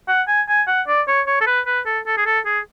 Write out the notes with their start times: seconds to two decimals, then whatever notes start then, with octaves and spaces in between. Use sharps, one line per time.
0.08 F#5
0.28 G#5
0.48 G#5
0.67 F#5
0.88 D5
1.08 C#5
1.27 C#5
1.41 A4
1.47 B4
1.67 B4
1.86 A4
2.06 A4
2.17 G#4
2.26 A4
2.45 G#4